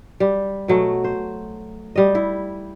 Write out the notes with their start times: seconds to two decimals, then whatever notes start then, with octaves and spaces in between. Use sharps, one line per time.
0.20 G3
0.68 B2 F#3 A3
1.04 C5
1.96 G3 D#5
2.15 E4